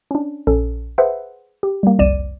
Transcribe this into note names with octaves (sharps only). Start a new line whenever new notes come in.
C#4 D4
A#1 C#4 A4
G#4 B4 C5 E5 F#5
G4
G3 A#3
G1 C2 F2 D5 D#7 E7